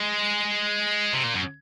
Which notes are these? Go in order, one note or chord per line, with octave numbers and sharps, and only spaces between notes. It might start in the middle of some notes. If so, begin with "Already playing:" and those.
Already playing: G#3
C3
A#2
F#2